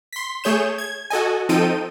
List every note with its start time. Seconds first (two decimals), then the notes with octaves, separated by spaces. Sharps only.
0.13 C6 B6
0.44 A3 G#4 C#5 G6 E7
0.78 G#6
1.10 F#4 A4 D#5 G#5
1.49 F3 C4 D#4 A4 G5 D#7